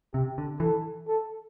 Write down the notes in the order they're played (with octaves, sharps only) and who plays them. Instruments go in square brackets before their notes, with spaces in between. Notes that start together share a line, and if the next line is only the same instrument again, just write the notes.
[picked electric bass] C3 [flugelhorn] G4
[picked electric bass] D3
[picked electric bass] E3 [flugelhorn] A4
[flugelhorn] A4